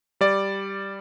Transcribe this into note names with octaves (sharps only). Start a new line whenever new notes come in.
G3 D5